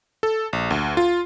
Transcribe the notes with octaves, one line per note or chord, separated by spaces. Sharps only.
A4
A#1
D2
F4